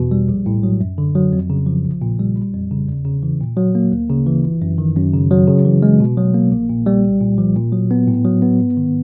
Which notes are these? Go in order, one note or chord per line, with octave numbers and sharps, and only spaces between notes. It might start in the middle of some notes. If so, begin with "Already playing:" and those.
Already playing: E2 B2
G3
A#1
A2
F#3
F#2
D3
F#3
F2
C#3
F3
A#1
A#2
G3
G1
F2
C#3
E2
C#3
E3
A#2
F#3
A#3
D2
C#3
E3
G1
F#2
D#3
F#2
C#3
F#3
C#3
E3
G#3
B2
F#3
A#3
A#1
A#2
G3
C2
A#2
F3
A#2
F#3
B3
A2
F#3
B3
G#2
D#3